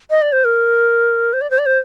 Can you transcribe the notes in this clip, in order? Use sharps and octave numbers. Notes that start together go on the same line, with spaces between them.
D#5
D5
C5
A#4
C5
D5
C5
D5
C5